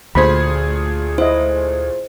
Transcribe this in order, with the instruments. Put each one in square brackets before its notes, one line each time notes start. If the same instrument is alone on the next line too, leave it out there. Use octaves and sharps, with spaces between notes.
[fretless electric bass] D2 [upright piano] A#2 A3 G#4 [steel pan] C5 B5
[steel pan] E4 D#5 [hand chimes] C5